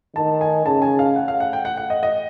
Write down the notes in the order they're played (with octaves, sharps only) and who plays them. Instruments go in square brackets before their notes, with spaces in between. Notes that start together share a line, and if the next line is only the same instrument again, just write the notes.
[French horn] D#3 [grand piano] A5
[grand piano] G#5
[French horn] C#3 [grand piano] A5
[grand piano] G#5
F5
F#5
F5
F#5
G5
F#5
F#5
D#5
D#5